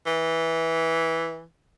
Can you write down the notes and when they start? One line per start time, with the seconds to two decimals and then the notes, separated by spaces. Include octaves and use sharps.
0.06 E3